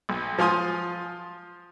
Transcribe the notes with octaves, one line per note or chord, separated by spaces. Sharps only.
B1
F3 F4 G#5 C6 D#6